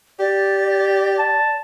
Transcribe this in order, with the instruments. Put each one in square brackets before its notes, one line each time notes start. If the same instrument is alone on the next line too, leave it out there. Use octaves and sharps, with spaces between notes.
[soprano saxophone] G4 [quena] D5
[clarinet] A5